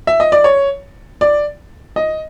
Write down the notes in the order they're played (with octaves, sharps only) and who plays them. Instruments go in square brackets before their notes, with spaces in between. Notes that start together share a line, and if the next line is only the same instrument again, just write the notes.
[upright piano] E5
D#5
D5
C#5
D5
D#5